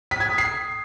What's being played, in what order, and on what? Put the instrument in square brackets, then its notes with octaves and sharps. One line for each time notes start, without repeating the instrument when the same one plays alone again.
[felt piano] B6
G#6
D#6
C7